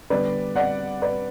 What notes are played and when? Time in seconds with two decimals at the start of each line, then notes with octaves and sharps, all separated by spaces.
0.10 D3 G3 B3 B4 D5
0.56 D5 F#5
1.02 B4 D5